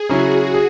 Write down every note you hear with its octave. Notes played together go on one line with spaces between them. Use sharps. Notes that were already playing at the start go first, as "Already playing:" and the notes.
Already playing: G#4
C#3 F#3 C#4 E4 F#4
G#4